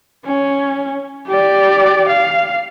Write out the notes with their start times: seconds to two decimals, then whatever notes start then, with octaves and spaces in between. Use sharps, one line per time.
0.25 C#4
1.28 G4 D5
2.08 F5